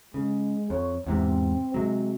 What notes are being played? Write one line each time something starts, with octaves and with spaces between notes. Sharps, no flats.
C#3 G#3
F2 C#5
E2 G#2 C3 C4
C3 F#3 G#3